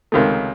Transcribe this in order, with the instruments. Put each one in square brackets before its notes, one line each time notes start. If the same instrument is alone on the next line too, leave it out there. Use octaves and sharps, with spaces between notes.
[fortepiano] C#2 C3 D#3 A3